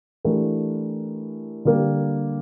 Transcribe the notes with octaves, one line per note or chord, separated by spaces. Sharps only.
E3 A3 D4 G4 A#4
D3 G3 A#3